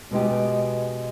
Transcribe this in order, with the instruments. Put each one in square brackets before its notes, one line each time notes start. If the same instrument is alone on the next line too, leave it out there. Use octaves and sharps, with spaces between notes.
[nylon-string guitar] B2 G#3 B3 D#4 G4